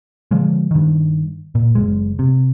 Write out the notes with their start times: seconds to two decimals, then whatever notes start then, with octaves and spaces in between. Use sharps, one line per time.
0.31 D3 F3 G#3
0.71 G2 D#3
1.55 A#2
1.75 F#1 D#2 G#3
2.19 C3